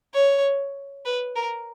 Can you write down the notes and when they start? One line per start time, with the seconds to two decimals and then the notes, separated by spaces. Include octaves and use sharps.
0.14 C#5
1.05 B4
1.36 A#4